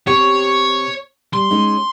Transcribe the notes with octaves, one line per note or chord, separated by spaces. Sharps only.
C3 G4 C#5
G3 C6
G#3 C#4 D#4